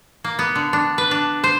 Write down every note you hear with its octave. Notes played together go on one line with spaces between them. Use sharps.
A#3
B3
D3
D4
B4
D4
C5